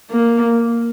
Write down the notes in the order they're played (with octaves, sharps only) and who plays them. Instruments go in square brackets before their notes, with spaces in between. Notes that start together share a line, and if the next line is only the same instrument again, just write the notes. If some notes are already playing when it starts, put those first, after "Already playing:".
[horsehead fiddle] A#3